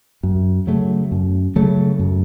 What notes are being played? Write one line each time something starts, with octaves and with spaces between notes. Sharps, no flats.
F#2
C#3 F#3 A3
F#2
C#3 F#3 A3
F#2